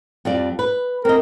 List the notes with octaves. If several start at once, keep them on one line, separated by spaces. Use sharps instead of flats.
F2 G3 D5
B4
C4 A#4 D#5